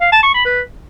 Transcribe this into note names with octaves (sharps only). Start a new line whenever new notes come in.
F5
A5
C#6
B5
B4